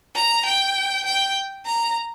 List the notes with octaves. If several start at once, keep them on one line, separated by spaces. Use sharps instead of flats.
A#5
G5
G5
A#5